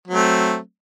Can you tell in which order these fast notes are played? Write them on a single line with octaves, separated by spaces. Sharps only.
F#3 C4 A3